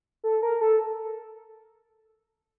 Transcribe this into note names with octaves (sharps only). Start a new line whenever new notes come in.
A4
A#4
A4